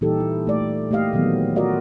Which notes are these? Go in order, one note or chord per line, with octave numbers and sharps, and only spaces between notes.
A#2 E3 G3 D#4 G4 A4
E4
A3 D5
A3 A#3 G4 D#5 F5
A#2 D#3 E3 F#3 B3
F4 F#4 A#4 D5 D#5 F5